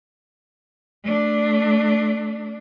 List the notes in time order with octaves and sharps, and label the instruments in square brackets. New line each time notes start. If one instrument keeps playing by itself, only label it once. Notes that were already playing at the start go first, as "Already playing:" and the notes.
[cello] A3 D4